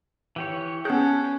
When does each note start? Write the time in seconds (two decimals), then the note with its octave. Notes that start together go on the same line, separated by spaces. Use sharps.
0.36 E3 G4 C#5
0.85 B3 C#4 G#4 A5 F#6 G6